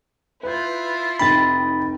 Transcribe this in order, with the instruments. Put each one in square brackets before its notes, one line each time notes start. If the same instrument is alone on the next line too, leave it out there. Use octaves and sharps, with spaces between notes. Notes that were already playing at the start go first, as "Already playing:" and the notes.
[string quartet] E4 F4 [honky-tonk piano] B4 G6
[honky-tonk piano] F1 D#4 G5 [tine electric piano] B5 A6